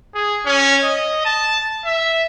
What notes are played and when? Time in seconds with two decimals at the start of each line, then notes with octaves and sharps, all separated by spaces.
0.14 G#4
0.46 C#4
0.83 D#5
1.25 A5
1.85 E5